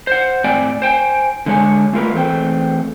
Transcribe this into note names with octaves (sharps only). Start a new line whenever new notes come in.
C5 F#5
A2 C4 D5 G5 G#5
C5 G5 G#5
D3 G#3 C#5 G#5
A3 F4 A#4 B4
E2 A3 C4 G5